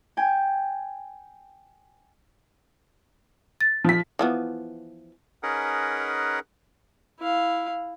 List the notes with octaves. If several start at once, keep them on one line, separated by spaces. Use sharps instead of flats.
G5 G#5
A6
F3 B6
E3 F3 B3
C#4 D#4 G#4 A#4 B4 F#5
E4 F5